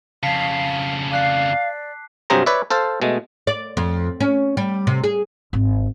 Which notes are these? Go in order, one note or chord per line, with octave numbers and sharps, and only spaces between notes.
F2 C#3 F5 A5 B6 C7
D5 F5 D6 F#6 C7
G2 C3 F#3 G#4 C5 A#5
B4 C#5 D5 E5
A4 C5 F5 A5
B2 G#3 A3
D5
F2
C#4
G3
C3
G#4
G#1